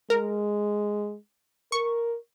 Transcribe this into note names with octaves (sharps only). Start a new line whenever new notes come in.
G#3 A#4
A#4 C#6